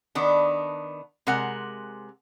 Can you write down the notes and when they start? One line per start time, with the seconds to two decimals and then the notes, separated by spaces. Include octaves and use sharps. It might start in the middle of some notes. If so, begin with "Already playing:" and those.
0.15 D#3 B3 D4
1.27 C3 G#3 A#4 F#5